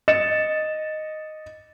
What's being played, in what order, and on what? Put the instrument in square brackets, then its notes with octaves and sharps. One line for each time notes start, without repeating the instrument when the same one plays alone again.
[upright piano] D#5 A6 C#7 E7